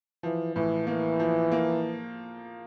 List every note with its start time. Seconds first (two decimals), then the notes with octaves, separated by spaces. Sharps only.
0.23 E3 F3
0.55 A2 E3
0.87 E3 A#3
1.19 F3
1.52 A#3